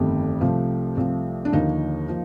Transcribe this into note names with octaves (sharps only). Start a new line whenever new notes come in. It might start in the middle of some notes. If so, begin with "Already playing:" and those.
Already playing: G1 F2 D#3 A3 G4
C2 C3 F3 A3
C2 C3 F3 A3
D4
D#2 D3 F3 A#3 D#4
F3 A#3